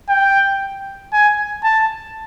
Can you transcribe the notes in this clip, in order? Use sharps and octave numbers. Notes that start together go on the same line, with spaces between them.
G5
G#5
A5